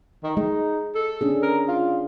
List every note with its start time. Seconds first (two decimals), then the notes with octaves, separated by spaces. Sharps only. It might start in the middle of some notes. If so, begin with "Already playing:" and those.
0.24 D#3
0.37 G#3 D#4
0.95 A4
1.21 C#4 D4 G#4
1.43 A#4
1.68 F4